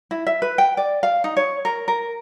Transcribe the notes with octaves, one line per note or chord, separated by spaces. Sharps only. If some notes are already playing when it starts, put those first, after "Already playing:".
E4
E5
B4
G5
D5
F5
D#4
C#5
A#4
A#4